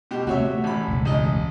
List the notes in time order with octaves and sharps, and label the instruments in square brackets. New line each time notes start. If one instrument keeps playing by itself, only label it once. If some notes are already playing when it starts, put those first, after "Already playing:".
[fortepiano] B2 G4
[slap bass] C3 A3 C4 [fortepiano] F#4 C#5 E5
[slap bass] A3
[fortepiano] A1 B5
[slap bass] E1 C#2 G#2
[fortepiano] A1 D#5